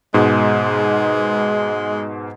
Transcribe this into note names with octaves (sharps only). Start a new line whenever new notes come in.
G#2 B2 G#3